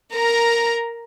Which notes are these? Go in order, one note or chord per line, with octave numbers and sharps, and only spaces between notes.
A#4 A#5